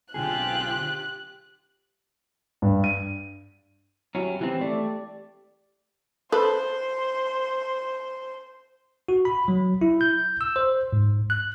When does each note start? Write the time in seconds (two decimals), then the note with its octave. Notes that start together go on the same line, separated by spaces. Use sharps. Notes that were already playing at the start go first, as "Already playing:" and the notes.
0.14 B1 D3 C4 F4 G4 G#4 G5 F#6
2.62 G2
2.84 D#7
4.15 F#3 C#4 E4 G4
4.41 E3 C4 G4
4.61 A3 D5
6.32 A4 B4 C5
9.08 F#4
9.25 B5
9.48 F#3
9.81 E4
10.01 G6
10.41 E6
10.56 C5
10.93 G#2
11.30 F#6